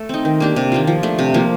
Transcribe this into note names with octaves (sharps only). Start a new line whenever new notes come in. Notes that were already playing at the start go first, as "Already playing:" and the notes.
Already playing: A3 A4
C4 D#4
D#3
A#3 D4 G4
C3
D#3 A#3 F4
F3
A3 D4
C3
F3 A#3